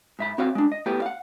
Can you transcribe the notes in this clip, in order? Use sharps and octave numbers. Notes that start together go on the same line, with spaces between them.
G#2 E5 B5
C4 F#4 C#5 E5 F5
G#3 D4
D#5
A3 B3 E4 G4 C#5
F5 F#5